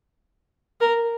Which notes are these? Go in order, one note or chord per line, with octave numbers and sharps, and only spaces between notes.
A#4